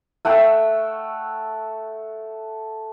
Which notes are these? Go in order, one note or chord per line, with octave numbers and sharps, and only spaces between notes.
A3 F#5 G5 E6